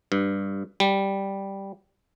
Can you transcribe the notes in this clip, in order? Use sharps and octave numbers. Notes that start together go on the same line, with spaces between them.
G2
G3